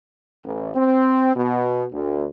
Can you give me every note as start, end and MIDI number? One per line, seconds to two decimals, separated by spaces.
0.45 0.70 33
0.74 1.35 60
1.35 1.85 47
1.92 2.25 38